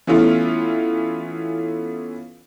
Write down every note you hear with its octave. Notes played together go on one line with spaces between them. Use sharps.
E3 A3 B3 C#4 E4 F4